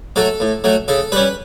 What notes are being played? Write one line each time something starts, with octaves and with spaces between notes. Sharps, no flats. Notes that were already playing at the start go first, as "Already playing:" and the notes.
F#3 A3 A4
A2
F#3 A3
C#3 A4
G3 C#4 B4